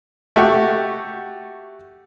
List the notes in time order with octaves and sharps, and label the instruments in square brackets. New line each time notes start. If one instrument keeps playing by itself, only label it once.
[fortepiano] A3 F#4 G4